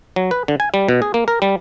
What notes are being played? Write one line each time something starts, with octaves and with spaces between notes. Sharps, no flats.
F#3
B4
D3
G#5
G3
B2
G#4
A#3
A#4
G3